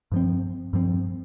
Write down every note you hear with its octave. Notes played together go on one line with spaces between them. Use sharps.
G2 F3 C4
G2 F3 C4